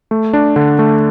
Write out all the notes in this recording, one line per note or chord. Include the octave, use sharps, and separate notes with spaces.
A3
D4
D3
A3